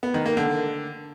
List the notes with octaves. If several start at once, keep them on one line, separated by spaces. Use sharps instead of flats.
B3
D#3
A#3
D3